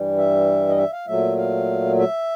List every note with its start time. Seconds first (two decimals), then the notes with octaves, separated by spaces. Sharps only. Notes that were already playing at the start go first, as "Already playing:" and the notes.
Already playing: G2 E3 G3
0.17 E5
0.69 D#5
0.77 E5
0.92 F5
1.07 A#2 F#3 A3 E5
1.38 F5
1.99 E5